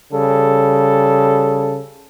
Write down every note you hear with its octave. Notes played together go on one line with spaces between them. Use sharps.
C#3 G3 A4